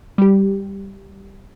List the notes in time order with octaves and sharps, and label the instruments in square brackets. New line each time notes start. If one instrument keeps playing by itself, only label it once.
[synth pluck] G3 G4